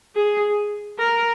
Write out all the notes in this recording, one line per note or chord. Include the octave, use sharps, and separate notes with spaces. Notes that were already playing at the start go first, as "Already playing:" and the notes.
G#4
A#4